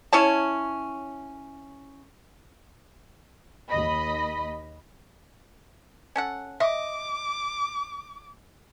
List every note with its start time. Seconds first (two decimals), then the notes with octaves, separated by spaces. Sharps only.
0.13 C#4 E4 C#5 A5
3.69 D#2 D#5 B5
6.16 C#4 A4 F#5
6.60 D#5 E5 D6